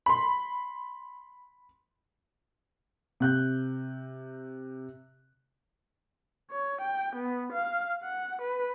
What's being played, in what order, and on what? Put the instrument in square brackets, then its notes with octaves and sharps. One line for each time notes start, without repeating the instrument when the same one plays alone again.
[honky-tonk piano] B5 C6
[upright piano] C3 F#6 G6
[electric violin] C#5
G5
B3
F5
F#5
B4